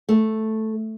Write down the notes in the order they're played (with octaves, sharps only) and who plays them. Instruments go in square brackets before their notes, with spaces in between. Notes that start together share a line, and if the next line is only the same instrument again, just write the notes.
[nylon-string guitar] A3